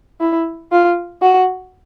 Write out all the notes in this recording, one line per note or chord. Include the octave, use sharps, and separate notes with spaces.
E4
F4
F#4